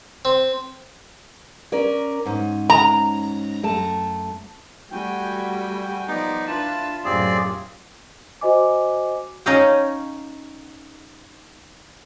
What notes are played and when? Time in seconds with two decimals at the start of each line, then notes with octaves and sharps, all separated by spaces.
0.25 C4
1.72 C#4 A#4 D5
2.26 G#2 C#4
2.70 A#5
3.63 F#2 A3 A5
4.92 G3 A3 F#4 G5 G#5
6.08 F3 B3 D#4 D5
6.47 D4 E4 F4 B4 A5
7.05 F#2 A2 C4 G4 G#4 D5
8.41 F#4 C5 D#5 G#5 D6
9.46 C#4 D#4 C#5 D#5 F5 G5